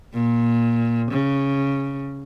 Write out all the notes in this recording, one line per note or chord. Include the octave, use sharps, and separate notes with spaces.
A#2
C#3